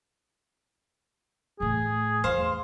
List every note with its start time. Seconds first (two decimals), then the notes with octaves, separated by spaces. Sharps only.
1.60 A2 E3 G#4
2.24 E2 E3 C5 F5 C6